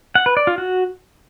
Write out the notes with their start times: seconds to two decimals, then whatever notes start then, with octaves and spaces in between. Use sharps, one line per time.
0.15 F#5
0.26 B4
0.37 D5
0.47 F4
0.58 F#4